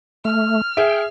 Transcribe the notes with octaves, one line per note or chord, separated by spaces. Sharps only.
A3 F6
G#4 E5 G5